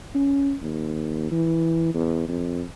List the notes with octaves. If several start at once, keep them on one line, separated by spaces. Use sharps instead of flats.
C#4
D#2
E3
E2
F2